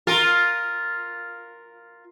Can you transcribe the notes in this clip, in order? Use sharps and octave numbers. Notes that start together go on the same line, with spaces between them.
F4 A#4